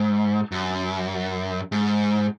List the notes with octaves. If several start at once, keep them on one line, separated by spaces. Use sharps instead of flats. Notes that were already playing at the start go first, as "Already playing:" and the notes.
Already playing: G#2
F#2
G#2